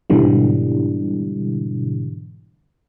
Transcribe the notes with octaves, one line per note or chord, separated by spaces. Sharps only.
G#2 B2 D3 E3 G3